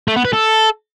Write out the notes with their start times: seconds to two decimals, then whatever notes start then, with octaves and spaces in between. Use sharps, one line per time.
0.08 A3
0.16 B3
0.25 B4
0.33 A4